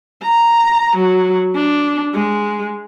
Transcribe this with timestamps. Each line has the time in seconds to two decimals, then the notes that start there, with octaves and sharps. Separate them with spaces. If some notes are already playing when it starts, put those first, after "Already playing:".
0.22 A#5
0.96 F#3
1.56 D4
2.14 G#3